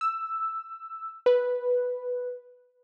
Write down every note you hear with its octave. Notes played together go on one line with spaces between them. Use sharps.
E6
B4